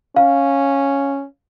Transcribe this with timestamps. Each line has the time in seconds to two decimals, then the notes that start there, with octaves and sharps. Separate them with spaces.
0.16 C#4 F5